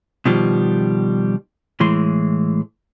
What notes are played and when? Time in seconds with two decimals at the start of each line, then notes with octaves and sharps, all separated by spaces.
0.25 B2 D#3 F3 G3
1.80 A2 E3 G#3 C6